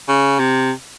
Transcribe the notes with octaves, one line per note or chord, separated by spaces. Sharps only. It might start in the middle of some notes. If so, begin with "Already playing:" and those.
C#3
C3